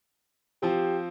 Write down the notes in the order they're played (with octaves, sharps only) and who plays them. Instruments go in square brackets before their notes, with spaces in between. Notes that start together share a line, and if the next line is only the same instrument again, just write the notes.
[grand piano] F3 C4 [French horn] G4